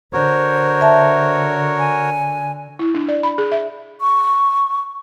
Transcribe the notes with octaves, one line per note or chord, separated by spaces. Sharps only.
D3 F#4 A#4 C5 C#5
E5 A5
G#5
E4
D4
D5
B5
G#4
E5
C#6